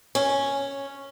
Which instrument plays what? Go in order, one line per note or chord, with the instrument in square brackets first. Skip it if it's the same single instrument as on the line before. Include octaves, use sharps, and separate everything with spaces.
[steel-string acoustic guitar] C#4